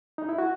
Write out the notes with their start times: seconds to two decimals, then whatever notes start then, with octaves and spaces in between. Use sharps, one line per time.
0.18 D#4
0.29 E4
0.38 F#4